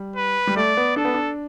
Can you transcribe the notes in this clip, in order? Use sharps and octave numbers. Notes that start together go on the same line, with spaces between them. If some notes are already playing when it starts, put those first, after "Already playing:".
Already playing: G3
B4
G3
A3 D5
B3
D4 A4
B3
D4